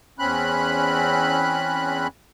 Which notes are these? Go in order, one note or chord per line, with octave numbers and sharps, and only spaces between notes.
E2 C4 C#4 B5 F#6